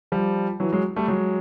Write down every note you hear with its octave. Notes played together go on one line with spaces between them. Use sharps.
F3 G3
E3 F#3
F#3 G#3
G3 A3
F#3 G#3